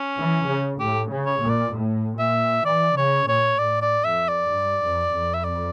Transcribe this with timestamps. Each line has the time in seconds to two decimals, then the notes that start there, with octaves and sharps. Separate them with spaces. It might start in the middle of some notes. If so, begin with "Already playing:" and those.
Already playing: C#4
0.18 E3
0.48 C#3
0.80 A2 G4
1.11 C#3
1.26 C#5
1.41 A#2
1.49 D5
1.73 A2
2.19 A#2 E5
2.65 E3 D5
2.96 C#3 C#5
3.28 A#2 C#5
3.58 A2 D5
3.82 D5
4.05 F2 E5
4.29 D5
4.51 G2
4.82 F2
5.14 F2
5.34 E5
5.44 D5